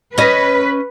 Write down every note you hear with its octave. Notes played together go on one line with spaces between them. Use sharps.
C#4 B4 D#5